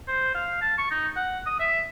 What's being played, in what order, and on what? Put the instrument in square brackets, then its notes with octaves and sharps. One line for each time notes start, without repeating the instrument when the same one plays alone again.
[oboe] C5
F5
A5
C#6
D#4
F#5
D#6
E5